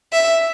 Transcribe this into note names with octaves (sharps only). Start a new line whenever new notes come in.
E5